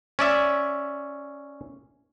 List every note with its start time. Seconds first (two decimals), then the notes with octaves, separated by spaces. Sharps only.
0.19 C#4 D5 E5